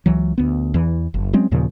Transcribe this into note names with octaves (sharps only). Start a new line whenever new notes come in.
C#2 E3 F#3
D2 B3
E2 E3
F#1
F#3 G#3 C4 C#4
D#2 A#2 C#3 F3